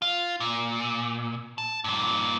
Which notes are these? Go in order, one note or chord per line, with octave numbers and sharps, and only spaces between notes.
F4
A#2
A5
G2 A#2